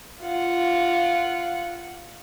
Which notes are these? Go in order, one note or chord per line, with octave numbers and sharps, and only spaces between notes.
F4 F#5